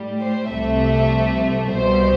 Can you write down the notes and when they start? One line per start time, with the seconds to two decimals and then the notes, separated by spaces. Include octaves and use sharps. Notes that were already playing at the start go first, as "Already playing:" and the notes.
Already playing: A2 G3
0.21 C5
0.50 C2 C3 F3 A3 E5
1.68 C2 B2 G3 C5